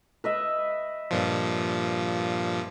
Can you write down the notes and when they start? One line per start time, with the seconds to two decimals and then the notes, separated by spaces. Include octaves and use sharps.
0.24 B4 D#5 E5
1.11 G2 A#2 F3